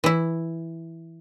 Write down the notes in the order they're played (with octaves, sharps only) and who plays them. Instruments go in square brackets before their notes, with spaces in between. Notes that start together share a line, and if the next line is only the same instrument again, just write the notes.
[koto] E3 E4